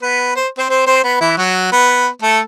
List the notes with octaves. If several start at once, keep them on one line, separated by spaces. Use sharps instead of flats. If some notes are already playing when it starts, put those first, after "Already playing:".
B3 B4
C5
C4 C5
C4 C5
C4 C5
B3 B4
E3 E4
F#3 F#4
B3 B4
A3 A4